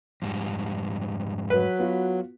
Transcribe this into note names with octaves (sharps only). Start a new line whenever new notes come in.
F2 G#2 G3
F#3 B4
B3 F4 F#4